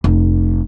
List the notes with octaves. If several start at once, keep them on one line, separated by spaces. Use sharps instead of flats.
F1